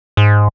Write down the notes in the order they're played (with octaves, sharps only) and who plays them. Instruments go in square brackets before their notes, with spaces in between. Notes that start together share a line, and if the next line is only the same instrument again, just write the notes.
[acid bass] G#2